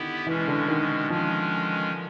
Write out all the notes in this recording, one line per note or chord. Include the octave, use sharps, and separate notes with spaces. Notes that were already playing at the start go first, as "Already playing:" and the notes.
Already playing: D3 D#3 B3 E4 G4
B2 E3 G#3 C#4
D3
D#3
D#3 F3 G#3 C#4